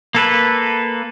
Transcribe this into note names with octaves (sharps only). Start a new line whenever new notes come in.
A#3 A4 B4